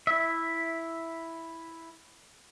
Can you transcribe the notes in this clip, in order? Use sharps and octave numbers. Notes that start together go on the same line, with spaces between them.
E4 E5